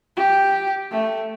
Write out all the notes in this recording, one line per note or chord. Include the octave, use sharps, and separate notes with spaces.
G4
A3